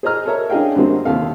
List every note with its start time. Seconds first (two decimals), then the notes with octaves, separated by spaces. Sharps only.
0.03 G#4 C5 D#5 A#5 F6
0.26 A4 A#4 C#5 E5 A#5
0.50 C#4 D4 G#4 D#5 F5 G5
0.75 F#2 D3 F#3 G3 A#3 C4
1.05 D#2 C3 A4 F5